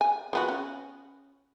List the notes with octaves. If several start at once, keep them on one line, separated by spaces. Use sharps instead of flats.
G#5
F3 B3 F#4
C#4